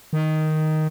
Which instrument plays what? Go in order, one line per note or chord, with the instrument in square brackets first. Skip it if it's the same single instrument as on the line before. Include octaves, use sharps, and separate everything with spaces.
[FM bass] D#3